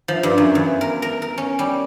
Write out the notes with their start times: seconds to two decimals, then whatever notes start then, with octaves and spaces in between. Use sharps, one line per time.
0.08 F3
0.23 G2
0.38 F#2
0.55 E2
0.81 A#4
1.02 A#4
1.22 A#4
1.38 C#4
1.59 G3